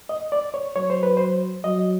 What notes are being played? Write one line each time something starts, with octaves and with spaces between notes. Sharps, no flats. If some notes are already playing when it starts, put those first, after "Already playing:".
D#5
D5
C#5
F#3 C#5
C5
B4
C5
F#3 D#5